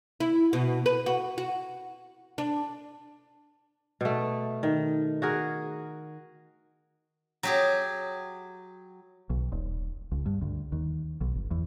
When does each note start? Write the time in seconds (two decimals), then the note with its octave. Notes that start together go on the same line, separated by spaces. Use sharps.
0.20 E4
0.53 B2
0.86 B4
1.06 F#4
1.38 F#4
2.38 D4
4.01 B2 A3
4.63 D#3
5.22 F#4 G#4 A#4
7.43 F#3 G4 G#4
9.30 B1
9.52 D#1
10.12 C#2
10.26 G2
10.42 D2
10.72 D#2
11.21 B1
11.35 G1
11.51 E2